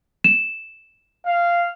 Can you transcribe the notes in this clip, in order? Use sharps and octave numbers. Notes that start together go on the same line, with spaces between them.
E7
F5